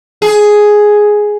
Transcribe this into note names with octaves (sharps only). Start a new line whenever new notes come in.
G#4